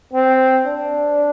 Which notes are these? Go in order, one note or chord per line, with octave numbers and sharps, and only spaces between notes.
C4
D4